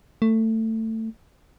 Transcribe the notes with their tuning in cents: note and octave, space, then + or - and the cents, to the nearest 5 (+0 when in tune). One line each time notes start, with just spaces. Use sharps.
A3 +20